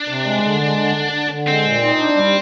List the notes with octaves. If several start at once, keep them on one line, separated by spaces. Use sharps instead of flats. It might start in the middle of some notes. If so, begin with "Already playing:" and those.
Already playing: D4
C3
G#3
D3
G#3
D3
D3
D3
D3
G#3 C4
A#2
D#4
D4
G3